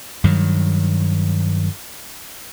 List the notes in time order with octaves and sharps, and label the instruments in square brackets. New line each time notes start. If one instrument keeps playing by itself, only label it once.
[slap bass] G2 D#3 F#3